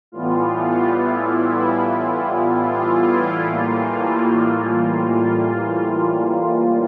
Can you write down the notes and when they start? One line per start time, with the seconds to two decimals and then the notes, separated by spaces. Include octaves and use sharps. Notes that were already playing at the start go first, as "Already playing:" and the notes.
0.12 A2 E3 G3 B3 F4
0.95 E4
2.61 F4
3.02 E4
3.44 A2 E3 G3 A#3 F4
5.10 F4